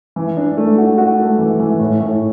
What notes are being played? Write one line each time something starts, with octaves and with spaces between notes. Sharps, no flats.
E3
D4
A3
F#4
F#4
A3
E3
E3
A2
A2